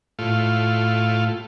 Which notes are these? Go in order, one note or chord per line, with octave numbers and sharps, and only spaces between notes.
A2 F4